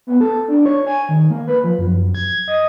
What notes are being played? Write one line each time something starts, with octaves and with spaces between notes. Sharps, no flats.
B3
A4
D4
C#5
G#5
D#3
A#3
B4
F3
F#2
G#6
D#5